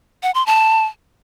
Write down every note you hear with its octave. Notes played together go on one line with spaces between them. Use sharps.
F#5
C6
A5